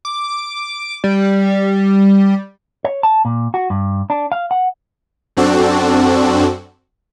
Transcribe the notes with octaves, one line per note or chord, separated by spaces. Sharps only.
D6
G3
C#5
A5
A#2
F#4
G2
D4
F5
F#5
F#2 C4 D4 F#4 A4